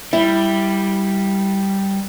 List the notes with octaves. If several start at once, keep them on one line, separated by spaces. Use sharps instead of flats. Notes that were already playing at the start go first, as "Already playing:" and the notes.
G3 E4